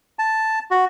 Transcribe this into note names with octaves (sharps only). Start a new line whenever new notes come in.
A5
F#4